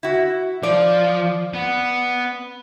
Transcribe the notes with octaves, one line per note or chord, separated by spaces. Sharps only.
E4 F#4
F3 D5
B3